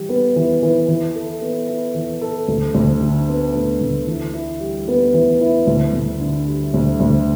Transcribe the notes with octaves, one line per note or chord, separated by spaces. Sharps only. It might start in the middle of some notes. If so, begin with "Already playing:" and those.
Already playing: E3 G3
B3
E3
E3
E3
A4
B3
E4
E3
A4
D2
D2
D3
B3
D2
D2
E3
E4
G3
B3
E3
E4
D2
D2
D3
G3
D2
D2